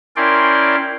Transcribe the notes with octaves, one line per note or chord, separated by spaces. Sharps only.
C#4 E4 A#4 D5 G5 C6